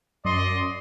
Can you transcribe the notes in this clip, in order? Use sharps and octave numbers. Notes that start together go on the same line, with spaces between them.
F#2 D5 D#5 C6